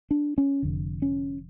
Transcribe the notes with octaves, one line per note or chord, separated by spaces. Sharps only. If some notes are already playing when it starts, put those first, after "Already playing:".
D4
C#4
F1 F2 D3
C#4